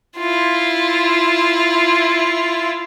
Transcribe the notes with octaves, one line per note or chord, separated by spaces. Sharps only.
E4 F4